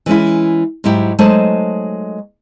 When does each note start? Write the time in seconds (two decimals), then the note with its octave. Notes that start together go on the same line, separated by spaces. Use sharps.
0.06 E3 G#3 C#4 E4
0.84 G#2 F#3 E4 G4
1.19 F#3 G#3 A3 D#4 C5 A5